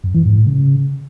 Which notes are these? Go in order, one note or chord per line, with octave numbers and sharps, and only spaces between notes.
F#2
E3
G#2
A2
C#3